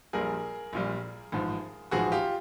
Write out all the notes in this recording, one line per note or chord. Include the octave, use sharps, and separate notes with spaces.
A#1 A#2 G3 G#4 A#4
A#1 A#2 G3
A1 G#2 F3
A1 G#2 F3 F#4 G#4
F4 G4